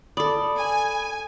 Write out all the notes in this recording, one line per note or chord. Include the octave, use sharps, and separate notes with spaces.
A4 D5 B5 D#6
G#5